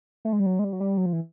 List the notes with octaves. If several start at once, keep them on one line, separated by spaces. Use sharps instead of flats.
A3
G#3
G3
F#3
G#3
G3
F#3
G3
F#3
F3
E3